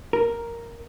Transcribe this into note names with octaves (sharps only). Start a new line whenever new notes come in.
A#4